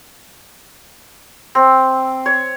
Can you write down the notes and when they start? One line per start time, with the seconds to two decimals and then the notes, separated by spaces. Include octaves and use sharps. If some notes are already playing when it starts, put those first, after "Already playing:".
1.55 C4
2.26 C#5